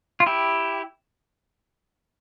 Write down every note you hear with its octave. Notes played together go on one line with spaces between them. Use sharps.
F4
E4 G4